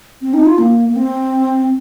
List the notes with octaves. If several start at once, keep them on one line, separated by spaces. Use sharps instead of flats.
C4
D#4
F4
A#3
A#3
C4